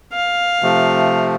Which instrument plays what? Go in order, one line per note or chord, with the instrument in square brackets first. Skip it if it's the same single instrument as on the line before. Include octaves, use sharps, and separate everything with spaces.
[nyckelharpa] F5
[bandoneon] C3 F3 A3